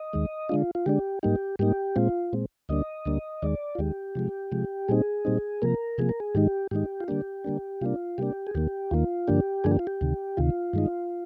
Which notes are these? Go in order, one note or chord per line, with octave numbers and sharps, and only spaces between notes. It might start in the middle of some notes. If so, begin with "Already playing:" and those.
Already playing: D#5
D#2 D#3 G#3
D3 G#3 D4 F4
F4
D3 G#3 D4 G4
G#2 G3 A#3 D#4 G4
G#2 G3 A#3 D#4 G4
A#2 G#3 C4 F4
A#2 G#3 C4
D2 D3 G3 A#3 D4 D#5
D2 D3 G3 A#3 D4
D#2 D#3 G#3 D5
F4
D#2 D#3 G#3 G4
C3 F3 G#3
C3 F3 G#3
A#2 G3 C4 D#4 G#4
A#2 G3 C4 D#4
C3 F3 A#3 A#4
C3 F3 A#3 G#4
A#4
G#4
G#2 D#3 G#3 D#4 G4
G#2 D#3 G#3 D#4 G4
F4
D3 G3 A#3 D4 G4
D3 G3 A#3 D4
C3 G3 A#3 D4 F4
C3 G3 A#3 D4 G4
G#4
D#2 D#3 A#3 G4
D#2 D#3 A#3 F4
G2 D3 F3 A#3 D4 G4
G2 D3 F3 A#3 D4 G#4
G4
F4
G4
D2 C3 D#3
D2 C3 D#3 F4
G2 D#3 G#3 D#4